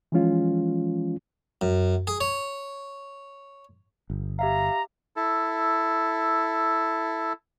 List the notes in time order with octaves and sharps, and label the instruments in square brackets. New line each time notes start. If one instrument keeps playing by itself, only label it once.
[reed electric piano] E3 F3 G#3 C#4 F4
[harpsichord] F#2
G#4
C#5
[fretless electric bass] G1
[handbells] G4 E5 F5 [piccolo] A#5
[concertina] E4 A4